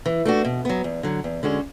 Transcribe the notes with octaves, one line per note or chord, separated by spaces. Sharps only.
E3
A3 D4 F#4
B2
F#3 B3
E2
D3 F#3
E2
D3 G#3 C#4 F#4